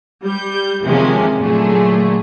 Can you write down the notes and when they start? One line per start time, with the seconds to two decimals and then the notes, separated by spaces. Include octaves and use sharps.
0.23 G3 G6
0.84 C3 D#3 F3 G#3 A#3 C#4
1.37 A#2 D3 F#3 A3 G#4